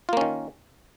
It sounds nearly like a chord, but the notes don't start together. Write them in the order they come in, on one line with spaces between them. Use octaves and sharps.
F4 A#3 C#4 D#3